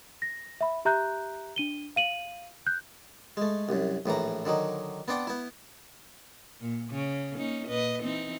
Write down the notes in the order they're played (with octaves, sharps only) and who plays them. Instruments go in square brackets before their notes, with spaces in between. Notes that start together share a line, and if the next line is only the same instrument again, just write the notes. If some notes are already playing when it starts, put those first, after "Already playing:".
[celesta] A#6
E5 B5
G4 E5 A#5 F#6 G6
D4 D#7 G7
F5 D#7 F#7
F#6 G6
[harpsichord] G#3 A3
C2 F#2
A#1 A2 E3 A#5
D3 D#3 F#3 D#4
B3 C4 D4 F#5 G5
B3 E4
[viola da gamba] A#2
C#3
A#3 C#4 D#4
A#2 B4 D#5
E3 C4 D#4